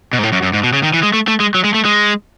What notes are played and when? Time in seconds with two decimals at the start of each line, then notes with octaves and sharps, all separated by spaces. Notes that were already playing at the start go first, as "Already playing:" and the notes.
0.13 B2
0.19 G#2
0.23 A2
0.32 F#2
0.43 F#2
0.54 G#2
0.63 B2
0.73 C#3
0.83 D#3
0.94 E3
1.03 G#3
1.14 A3
1.28 A3
1.40 G#3
1.54 F#3
1.64 G#3
1.74 A3
1.85 G#3